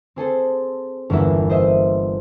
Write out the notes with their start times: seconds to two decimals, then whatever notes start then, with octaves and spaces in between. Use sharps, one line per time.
0.16 C4 G#4 A4 C5
1.10 G1 E2 F#3 A#3 E5 A#6
1.50 C5 D#5 E5